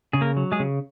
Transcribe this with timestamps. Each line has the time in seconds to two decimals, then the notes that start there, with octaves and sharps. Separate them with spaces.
0.13 C#3 G#4
0.21 A#3 A#4
0.37 F#3
0.52 G#3 G#4
0.60 C#3